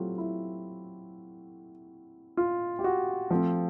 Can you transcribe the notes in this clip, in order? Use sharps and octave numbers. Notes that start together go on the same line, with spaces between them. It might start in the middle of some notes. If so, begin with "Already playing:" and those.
Already playing: F#3 A3 C4 E4 F4 G4
E4
F4
G4
F#4
F3 A3 C4 F4